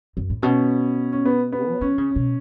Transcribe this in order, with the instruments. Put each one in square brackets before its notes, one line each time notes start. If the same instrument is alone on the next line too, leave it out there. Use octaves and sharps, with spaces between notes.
[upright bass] F#2
A2
[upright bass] B2 [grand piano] C#4
[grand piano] C#4
B3
B3
[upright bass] F#3
[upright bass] E3 [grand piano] C#4
[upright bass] C#3
B2